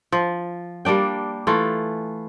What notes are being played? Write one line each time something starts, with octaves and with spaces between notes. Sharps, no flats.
F3
G3 A#3 D4 G5
E3 A3 F4